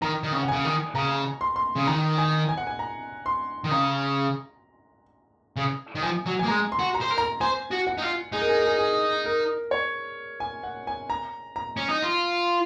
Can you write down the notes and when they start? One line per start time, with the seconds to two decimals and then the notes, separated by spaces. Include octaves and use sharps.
0.02 D#3 A#5
0.23 D#3
0.33 C#3
0.43 F#5
0.48 C#3 G#5
0.64 D#3
0.95 C#3 A#5
1.41 C6
1.56 C6
1.76 C#3
1.87 D#3 A#5
2.18 G#5
2.49 G#5
2.58 F#5
2.67 G#5
2.79 A#5
3.26 C6
3.64 D#3
3.71 C#3 A#5
5.57 C#3
5.95 D#3
6.02 F3 G#5
6.26 F#3
6.39 A#3 G#5
6.48 G#3 A#5
6.72 C6
6.79 F#4
6.94 A#5
7.01 C5
7.10 A#4
7.18 A#5
7.41 C5 G#5
7.71 F#4
7.87 F#5
7.98 D#4
8.02 F4
8.32 D#4 G#4
8.42 A#4
8.49 G#4
8.58 A#4
8.66 G#4
8.79 G#4
9.26 A#4
9.71 C#5
10.40 G#5
10.63 F#5
10.87 G#5
11.10 A#5
11.56 A#5
11.77 C#4
11.89 D#4
12.02 F4